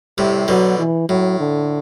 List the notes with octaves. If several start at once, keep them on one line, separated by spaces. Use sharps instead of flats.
A2 C3 G3
B2 D3 F#3
E3
A2 F#3
D3